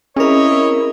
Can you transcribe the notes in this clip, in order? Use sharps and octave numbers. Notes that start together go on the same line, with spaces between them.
C4 C#4 E4 G#4 A#4 C#5 D#5